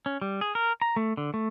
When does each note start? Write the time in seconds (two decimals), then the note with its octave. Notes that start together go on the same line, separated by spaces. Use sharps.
0.06 C#4
0.22 G3
0.41 G#4
0.55 A#4
0.82 A#5
0.96 A3
1.17 D3
1.34 A3